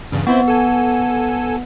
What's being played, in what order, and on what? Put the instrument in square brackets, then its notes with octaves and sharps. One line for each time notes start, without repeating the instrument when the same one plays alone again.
[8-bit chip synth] E2 G2 C#3
[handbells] B3 [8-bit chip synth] C4 E4 C5
[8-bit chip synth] A4 G#5